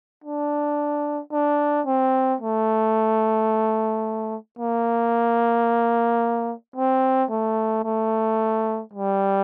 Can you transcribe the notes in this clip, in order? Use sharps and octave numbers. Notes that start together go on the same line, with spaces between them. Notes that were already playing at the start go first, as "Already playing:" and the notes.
D4
D4
C4
A3
A#3
C4
A3
A3
G3